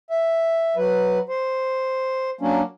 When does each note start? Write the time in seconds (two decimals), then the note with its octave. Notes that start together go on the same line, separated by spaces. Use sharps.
0.11 E5
0.76 F#3 B4
1.29 C5
2.41 F#3 A#3 C#4 D4